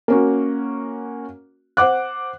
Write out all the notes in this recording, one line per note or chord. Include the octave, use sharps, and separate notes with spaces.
A#3 C#4 F#4
C5 F#5 D6 F#6